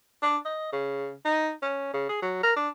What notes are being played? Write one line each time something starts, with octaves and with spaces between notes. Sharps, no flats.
D4
D#5
C#3
D#4
C#4
C#3
G#4
F#3
A#4
D4